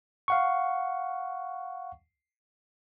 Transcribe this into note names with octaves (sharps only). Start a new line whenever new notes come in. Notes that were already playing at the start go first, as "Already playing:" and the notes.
F5 F#5 C#6